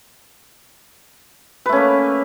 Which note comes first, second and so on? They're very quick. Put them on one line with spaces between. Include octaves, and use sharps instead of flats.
B4 A3 C#4 A#3